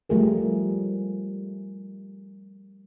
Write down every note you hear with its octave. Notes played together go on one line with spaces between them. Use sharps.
F3 G3 A3 F4 G#4 A#4